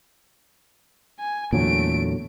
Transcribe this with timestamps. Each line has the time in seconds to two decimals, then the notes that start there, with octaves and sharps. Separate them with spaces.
1.20 G#5
1.53 E2 A#2 D3 F#3 A3 D7